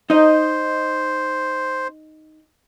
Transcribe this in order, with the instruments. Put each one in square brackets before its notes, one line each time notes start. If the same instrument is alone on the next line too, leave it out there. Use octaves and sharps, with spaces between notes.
[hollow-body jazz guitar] D#4 D#5 [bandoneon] C5